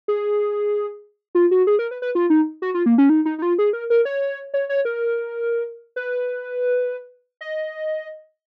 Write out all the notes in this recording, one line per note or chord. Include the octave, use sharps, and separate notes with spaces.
G#4
F4
F#4
G#4
A#4
B4
B4
F4
D#4
F#4
F4
A#3
C#4
D#4
D#4
D#4
F4
G#4
A#4
A#4
C#5
C#5
C#5
A#4
B4
D#5